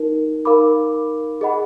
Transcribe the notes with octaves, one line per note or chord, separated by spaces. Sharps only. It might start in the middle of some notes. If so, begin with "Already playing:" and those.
Already playing: D#4 A#4
D#4 A#4 F5 B5 D6
G#4 D#5 F#5 B5